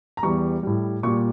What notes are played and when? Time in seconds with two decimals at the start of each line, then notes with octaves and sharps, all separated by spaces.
0.17 A#5
0.23 E2 E3 G3 C#6
0.63 A2 G3
1.03 A#2 G3 C#6